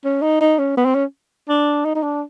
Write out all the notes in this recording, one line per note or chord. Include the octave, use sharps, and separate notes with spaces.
C#4
D#4
D#4
C#4
B3
C4
C#4
D4
D#4
D#4
D4